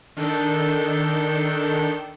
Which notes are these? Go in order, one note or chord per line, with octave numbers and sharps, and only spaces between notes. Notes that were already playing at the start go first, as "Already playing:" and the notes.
D#3 D4 A4 G6